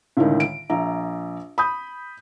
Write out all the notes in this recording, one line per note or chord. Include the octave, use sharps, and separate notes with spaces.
C#2 A2 D3 D#3
D7
A#1 E5 A#5
B5 D#6 G6